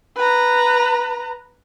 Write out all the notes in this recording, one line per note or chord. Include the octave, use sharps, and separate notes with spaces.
B4 A#5